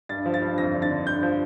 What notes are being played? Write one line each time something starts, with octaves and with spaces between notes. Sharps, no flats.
G2 A6
F3
A6
G2
F2 A#6
D3
A6
D3
G2 G6
F3